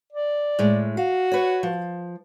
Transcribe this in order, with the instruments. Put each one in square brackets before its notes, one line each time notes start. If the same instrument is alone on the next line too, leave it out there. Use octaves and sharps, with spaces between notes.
[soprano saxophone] D5
[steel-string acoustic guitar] A2 G#3
[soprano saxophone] F#4 [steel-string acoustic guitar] F5
[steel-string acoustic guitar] B4 C#5
F3